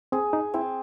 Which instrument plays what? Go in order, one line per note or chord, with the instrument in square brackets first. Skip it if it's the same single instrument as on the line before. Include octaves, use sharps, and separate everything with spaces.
[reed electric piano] C4 [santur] G#4
[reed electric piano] D#4
[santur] C4 [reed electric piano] E4